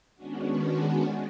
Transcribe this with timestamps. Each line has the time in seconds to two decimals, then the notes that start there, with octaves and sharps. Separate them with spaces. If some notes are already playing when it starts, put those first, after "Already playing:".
0.15 D#3 G#3 B3 C#4 D4 F#4